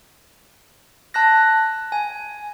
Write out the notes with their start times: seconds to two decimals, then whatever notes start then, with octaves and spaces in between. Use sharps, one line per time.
1.14 A5 F#6 A#6
1.92 G#5